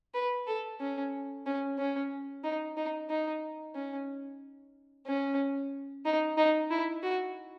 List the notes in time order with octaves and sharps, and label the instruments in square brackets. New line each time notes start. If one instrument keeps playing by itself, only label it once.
[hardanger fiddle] B4
A4
C#4
C#4
C#4
D#4
D#4
D#4
C#4
C#4
D#4
D#4
E4
F#4